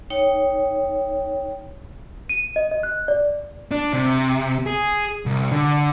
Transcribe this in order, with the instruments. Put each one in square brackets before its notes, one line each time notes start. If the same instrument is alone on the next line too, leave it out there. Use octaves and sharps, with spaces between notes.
[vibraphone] D#4 C#5 G5
[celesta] D#7
D#5
D#5
F#6
D5
[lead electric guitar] D4
C3
G#4
C2
D3